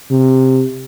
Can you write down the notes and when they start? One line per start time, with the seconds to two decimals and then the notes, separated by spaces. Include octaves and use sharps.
0.11 C3